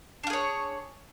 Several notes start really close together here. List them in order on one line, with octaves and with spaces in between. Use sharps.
D4 F4 G#4 C#5